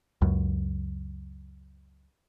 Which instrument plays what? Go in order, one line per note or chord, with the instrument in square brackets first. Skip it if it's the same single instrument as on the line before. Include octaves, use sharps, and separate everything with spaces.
[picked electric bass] C#2 F#2